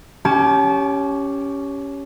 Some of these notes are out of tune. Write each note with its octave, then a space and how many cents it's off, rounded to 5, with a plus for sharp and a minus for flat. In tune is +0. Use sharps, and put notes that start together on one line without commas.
C#4 +10 G4 +0 A5 -35